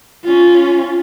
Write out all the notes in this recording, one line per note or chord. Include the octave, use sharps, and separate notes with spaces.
C#4 F4